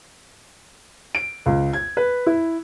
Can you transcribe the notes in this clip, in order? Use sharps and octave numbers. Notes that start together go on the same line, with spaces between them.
D7
C#2
G#6
B4
E4